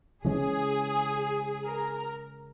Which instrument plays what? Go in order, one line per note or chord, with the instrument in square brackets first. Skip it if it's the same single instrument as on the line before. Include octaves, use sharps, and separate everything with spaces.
[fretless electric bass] C#3 E3 G#3 C#4 [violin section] G#4
[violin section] A#4